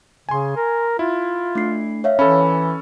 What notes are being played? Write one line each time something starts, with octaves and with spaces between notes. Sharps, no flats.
C#3 G#5 C6
A#4
E4 F4
A3 D4 C7
C#5 E5 F5
E3 C#4 A4 B5